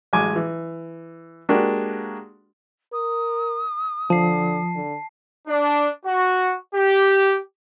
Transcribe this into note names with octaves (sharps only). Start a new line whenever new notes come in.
A1 F#3 G#3 G#5 D6
E3
G#3 A#3 D4 F#4 G4 A#4
A#4 D#6
D3 F3 A5 C7
D3
D4
F#4
G4